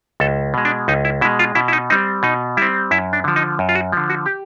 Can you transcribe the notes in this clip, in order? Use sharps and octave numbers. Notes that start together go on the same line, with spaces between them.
C#2 A4
B2 G#3
D4
C#2 D#4
E4
B2 G#3 E4
F4
B2 E4
E4
D#4
G3 C4 D#4
B2 D#4
G3 C4 E4
F#2 E4
D4
D3 F3
D#4
F#2
F4
F#4
D3 F3
F#4
G4